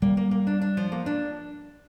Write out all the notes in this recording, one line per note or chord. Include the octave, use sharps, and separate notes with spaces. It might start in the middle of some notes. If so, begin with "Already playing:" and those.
G3 A#3
A#3
A#3
D4
D4
F3
A#3
D4